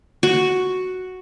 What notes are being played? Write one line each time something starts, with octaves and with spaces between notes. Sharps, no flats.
F#4